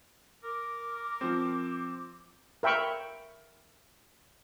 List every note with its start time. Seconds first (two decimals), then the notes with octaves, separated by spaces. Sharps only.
0.43 A#4 D6
1.21 F3 C4
2.63 A#4 E5 G5 B5 C#6